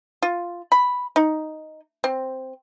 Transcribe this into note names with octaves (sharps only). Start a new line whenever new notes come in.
F4
B5
D#4
C4